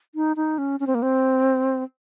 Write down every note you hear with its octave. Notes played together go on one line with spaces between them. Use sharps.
D#4
D#4
C#4
C#4
C4
A#3
C4